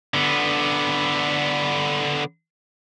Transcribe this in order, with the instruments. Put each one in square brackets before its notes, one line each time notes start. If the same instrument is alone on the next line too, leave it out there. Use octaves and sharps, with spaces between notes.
[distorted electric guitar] D3 B3